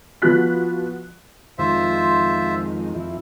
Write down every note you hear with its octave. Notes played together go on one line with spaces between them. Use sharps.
F3 B3 F4 F#4 F#6 B6
F2 D#3 G#3 F4 C5 E5
F2 E4